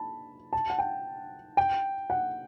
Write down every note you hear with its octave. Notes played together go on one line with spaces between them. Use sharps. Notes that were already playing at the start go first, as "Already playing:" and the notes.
Already playing: A5 B5
A5
F#5
G5
G5
F#5